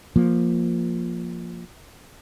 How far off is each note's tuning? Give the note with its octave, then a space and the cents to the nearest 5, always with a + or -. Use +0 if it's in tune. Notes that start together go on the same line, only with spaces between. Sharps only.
F3 +0 A#3 +0